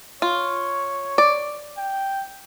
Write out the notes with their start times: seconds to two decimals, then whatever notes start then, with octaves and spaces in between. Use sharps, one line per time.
0.22 F4 C#5
1.18 D5
1.78 G5